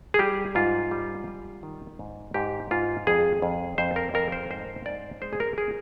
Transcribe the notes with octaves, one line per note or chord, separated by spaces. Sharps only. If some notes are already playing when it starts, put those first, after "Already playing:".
G#4
G3 G4
G#2 F4
G3
G3
D#3
G#2
G#2 G4
G#2 F4
F2 G#4
F2
F2 C5
A#4
F2 A#4
C5
G#2 C5
G#2 D5
G#3 C5
G#4
A#4
G#4